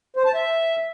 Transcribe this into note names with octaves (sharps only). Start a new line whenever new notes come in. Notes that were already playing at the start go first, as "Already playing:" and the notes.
C5
A5
E5